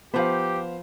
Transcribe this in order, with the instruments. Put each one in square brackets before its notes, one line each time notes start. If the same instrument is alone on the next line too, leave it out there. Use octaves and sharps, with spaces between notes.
[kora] F3 B4 [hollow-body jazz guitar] B3 [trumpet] G4 [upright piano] C5 F5